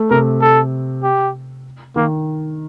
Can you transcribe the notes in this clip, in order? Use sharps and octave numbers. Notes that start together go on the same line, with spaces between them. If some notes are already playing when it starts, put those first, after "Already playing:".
Already playing: A3
C3 A#4
A4
G4
D#3 A#3